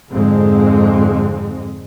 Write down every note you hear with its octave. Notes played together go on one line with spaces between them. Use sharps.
F2 G#2 D3 G#3 C4